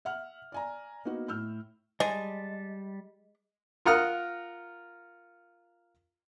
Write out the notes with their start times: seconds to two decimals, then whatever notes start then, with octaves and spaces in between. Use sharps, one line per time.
0.05 E5 F#5 F6
0.52 D5 G#5 A#5
1.05 A#3 B3 D#4 F#4
1.28 A2 E6 F6 G6
2.00 G3 G#3 A5
3.85 F4 A#4 F#5 D#6 F6